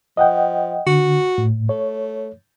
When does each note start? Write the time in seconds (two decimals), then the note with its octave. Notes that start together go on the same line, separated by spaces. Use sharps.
0.17 F3 D#5 F#5 G5
0.87 D3 F#4
1.38 A2
1.69 A3 C#5